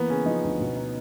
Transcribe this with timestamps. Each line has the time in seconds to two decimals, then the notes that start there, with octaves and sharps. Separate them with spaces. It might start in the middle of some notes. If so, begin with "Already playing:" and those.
Already playing: E3 A#3 B3
0.10 C#3 C#4
0.26 F3 D#4
0.44 D2
0.60 B2
0.77 D#4